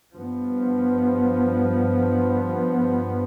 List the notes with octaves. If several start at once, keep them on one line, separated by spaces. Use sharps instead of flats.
G2 F3 B3